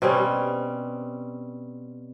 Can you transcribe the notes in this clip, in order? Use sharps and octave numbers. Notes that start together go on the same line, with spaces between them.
B2 G3 C4 C#4